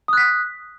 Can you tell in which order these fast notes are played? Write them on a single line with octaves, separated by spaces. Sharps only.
D#6 F#6 B6